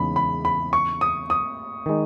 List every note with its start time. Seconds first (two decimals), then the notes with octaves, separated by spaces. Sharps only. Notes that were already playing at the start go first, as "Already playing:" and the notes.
Already playing: E2 C#3 G#3 D#4 B5
0.16 B5
0.45 B5
0.73 C#6
1.01 D#6
1.30 D#6
1.86 D#3 G#3 D#4